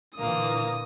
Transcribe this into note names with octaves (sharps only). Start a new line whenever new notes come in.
A#2 D3 E3 A#3 D#6